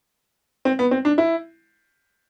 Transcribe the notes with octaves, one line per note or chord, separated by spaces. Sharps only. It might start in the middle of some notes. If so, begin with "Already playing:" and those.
C4
B3
C4
D4
E4